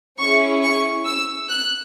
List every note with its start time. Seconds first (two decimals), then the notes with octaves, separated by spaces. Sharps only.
0.19 C#4 E4 G#4 C#6
0.62 C#6
1.06 E6
1.49 F#6